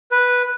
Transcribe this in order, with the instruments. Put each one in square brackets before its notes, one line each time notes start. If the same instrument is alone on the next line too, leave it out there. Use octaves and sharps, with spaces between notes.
[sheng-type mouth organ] B4